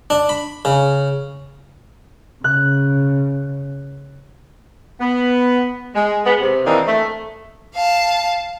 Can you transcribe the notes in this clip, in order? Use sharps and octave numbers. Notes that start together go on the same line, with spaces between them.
D4
B5
C#3
C#3 F#6
B3
G#3
G#3 B3
C3
D#3 E3 A#3 C4 D4 D#4
A3
F5 A5